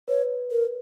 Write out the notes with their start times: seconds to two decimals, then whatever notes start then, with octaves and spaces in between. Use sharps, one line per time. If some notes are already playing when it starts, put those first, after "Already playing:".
0.08 B4 C#5
0.51 A#4